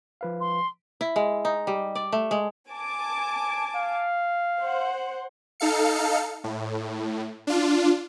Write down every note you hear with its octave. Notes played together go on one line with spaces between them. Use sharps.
F3 B4 F5
C6
E4
G#3
D#4
G3
D5
A3
G#3
G#5 A5 D6
F5
C5 F#5
D#4 A4 F5 C#7
A2
D4 F4